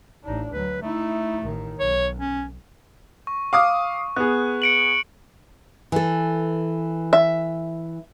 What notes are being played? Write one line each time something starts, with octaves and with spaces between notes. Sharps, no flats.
A1 D4 D#4
D2 F#3 B4
A3 D#4 E4
A1 D#3
B1 C#5
C#4
C#6
F5 D6 D#6
B3 G#4 F#6
C#7 D7 F#7
E3 A4
E5